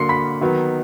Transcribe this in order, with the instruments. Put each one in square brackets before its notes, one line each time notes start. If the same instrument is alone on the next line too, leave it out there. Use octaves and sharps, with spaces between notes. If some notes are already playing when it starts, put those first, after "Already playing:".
Already playing: [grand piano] D3 F#3 A#3 C6 C7 C#7
B5 B6
D#3 F#3 B3